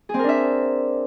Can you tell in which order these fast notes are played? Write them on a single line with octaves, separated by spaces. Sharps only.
G#4 C4 A#4 D4 E5